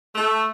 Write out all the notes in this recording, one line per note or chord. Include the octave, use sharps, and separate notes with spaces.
A3